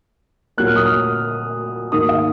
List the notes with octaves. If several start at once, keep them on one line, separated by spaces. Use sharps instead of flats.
A#2 F#3 A#3 F#6
F6
D#6
F6
G#2 D#3 A#3 D#6
F5